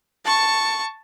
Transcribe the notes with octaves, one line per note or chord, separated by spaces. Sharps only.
A5 C#6